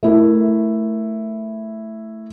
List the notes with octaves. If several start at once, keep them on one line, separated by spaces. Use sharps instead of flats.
A3 E4 A#4